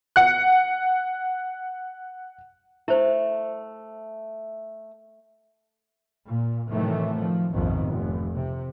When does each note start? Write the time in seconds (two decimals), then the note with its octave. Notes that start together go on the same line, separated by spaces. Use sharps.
0.16 F#5 F#6
2.88 A3 E4 C5
6.28 A#2
6.69 A2 C3 D#3 E3 F#3 A3
7.18 F3
7.52 A#1 F2 G#2 B2 D#3
7.86 F1
8.34 C3